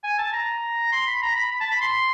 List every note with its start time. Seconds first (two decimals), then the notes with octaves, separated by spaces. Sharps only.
0.04 G#5
0.18 A5
0.33 A#5
0.92 C6
1.07 B5
1.22 A#5
1.36 B5
1.51 B5
1.61 A5
1.71 B5
1.81 C6